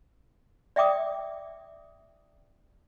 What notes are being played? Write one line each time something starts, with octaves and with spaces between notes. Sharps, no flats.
D5 E5 G5 D6 D#6